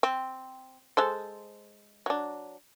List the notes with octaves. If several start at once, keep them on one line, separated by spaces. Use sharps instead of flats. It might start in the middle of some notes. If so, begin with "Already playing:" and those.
C4
G#3 A4 C5
F#3 D4